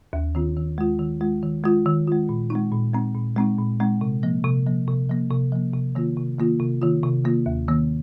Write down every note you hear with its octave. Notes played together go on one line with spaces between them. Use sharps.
D#2
D#3 C4 F4
D#3
G#3 F4
D#3
G#3 F4
D#3
G#3 F4
D#3
G#3 F4
A#2
G#3 C4 D#4
A#2
G#3 C4 D#4
A#2
G#3 C4 D#4
A#2
G#3 C4 D#4
C3
F3 A#3
C3
F3 A#3
C3
F3 A#3
C3
F3 A#3
C3
D#3 A#3 F4
C3
D#3 A#3 F4
C3
D#3 A#3 F4
C3
D#3 A#3 F4
D#2
D#3 A#3